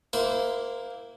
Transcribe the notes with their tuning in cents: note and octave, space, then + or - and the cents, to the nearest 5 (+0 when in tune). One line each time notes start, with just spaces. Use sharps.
A#3 +0 E4 +0 C5 -25